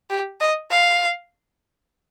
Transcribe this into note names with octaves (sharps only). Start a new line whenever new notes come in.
G4
D#5
F5